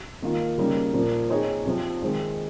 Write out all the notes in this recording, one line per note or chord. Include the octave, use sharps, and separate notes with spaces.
D#3 A#3 F4 A#4
C#3 G3 A#3 D#4
A#2 F3 A#3
C4 D#4 G#4 C#5
C3 F3 C4
D#3 G#3 C4